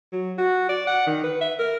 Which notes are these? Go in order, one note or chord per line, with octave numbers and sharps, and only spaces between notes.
F#3
F#4
D5
F#5
D#3
B4
E5
A#4